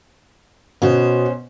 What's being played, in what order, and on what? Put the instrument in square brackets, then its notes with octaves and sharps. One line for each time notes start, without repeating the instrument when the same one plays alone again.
[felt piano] B2 B3 [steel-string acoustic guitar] C#4 C5